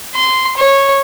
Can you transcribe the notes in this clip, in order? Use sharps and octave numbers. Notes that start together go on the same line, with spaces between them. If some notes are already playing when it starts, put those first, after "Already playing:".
C6
C#5